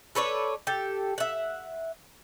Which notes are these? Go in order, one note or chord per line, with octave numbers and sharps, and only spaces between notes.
A4 B4 C#5 D5
G4 A4
E5 F#5